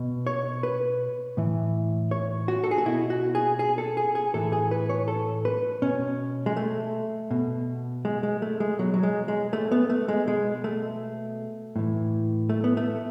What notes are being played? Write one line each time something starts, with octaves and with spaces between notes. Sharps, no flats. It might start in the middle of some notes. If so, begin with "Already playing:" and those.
Already playing: B2
C#5
B4
A2 E3
C#5
F#4
A4
G#4
F#4
B2 E4
F#4
G#4
G#4
A4
G#4
G#4
A2 E3 A4
G#4
B4
C#5
A4
B4
B2 C#4
G#3
A3
B2
G#3
G#3
A3
G#3
B2 F#3
F#3
G#3
G#3
A3
B3
A3
G#3
B2 G#3
A3
A2 E3
A3
B3
A3